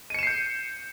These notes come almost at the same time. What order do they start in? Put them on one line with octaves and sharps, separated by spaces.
D#7 C#7 E7 C7 G6